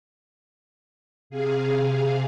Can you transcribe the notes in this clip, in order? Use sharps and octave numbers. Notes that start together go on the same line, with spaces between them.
C3 G#4 F5